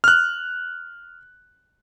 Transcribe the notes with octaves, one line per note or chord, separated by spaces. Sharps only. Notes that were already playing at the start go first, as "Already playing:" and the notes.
F6 F#6